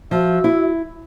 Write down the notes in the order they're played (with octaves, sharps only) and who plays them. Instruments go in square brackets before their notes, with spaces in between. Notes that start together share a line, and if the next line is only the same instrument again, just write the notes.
[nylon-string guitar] F3 [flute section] F#4 E5 E6
[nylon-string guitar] E4